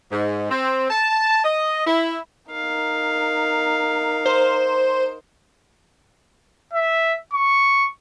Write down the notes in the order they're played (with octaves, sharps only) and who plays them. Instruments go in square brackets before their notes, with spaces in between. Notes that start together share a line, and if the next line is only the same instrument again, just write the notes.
[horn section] G#2
C4
A5
D#5
E4
[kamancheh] D#4 A#4 [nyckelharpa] F5
[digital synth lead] C5
[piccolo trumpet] E5
C#6